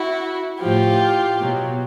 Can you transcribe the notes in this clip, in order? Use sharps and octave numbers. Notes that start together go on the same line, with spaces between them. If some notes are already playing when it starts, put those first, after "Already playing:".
Already playing: E4 F#4
A2 F3 F4 G4
B2 F#3